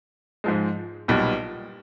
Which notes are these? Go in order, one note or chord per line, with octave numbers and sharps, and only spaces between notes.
G#2 F3 G#3
B1 A#2 G3 B3